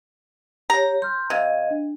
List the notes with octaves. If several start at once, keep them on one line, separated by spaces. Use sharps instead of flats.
G4 C#5 A#5
C6 F6 G6
C3 D#5 F5 G#6
D4